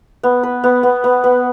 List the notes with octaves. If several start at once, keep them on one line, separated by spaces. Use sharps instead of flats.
B3
B4
B3
B3
B3
B3